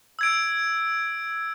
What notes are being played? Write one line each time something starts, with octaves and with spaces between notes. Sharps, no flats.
E6 G#6 D7